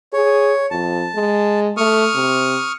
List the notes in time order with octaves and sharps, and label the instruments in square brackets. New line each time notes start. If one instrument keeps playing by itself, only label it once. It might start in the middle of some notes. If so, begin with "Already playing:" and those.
[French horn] G#4 [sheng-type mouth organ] C#5
[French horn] F2 [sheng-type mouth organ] A5
[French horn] G#3
[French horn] A3 [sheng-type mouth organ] C#6 D#6 F6
[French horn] C3